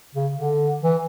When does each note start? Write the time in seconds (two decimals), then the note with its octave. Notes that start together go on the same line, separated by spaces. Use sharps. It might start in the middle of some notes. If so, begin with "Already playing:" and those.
0.15 C#3
0.33 D3
0.84 E3